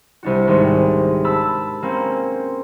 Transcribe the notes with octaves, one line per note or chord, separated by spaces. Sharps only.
C2 D4 F#4
G#1
A5 B5 E6
A#3 C4 C#4